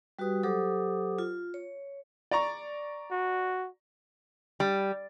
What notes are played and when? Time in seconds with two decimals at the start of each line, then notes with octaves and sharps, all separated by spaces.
0.19 G3 F#4 G4 B4 D#6
0.43 F#3 G4 A4 C5 D6 D#6
1.18 F4
1.54 C#5
2.31 D5 A#5 C#6
3.11 F#4
4.60 G3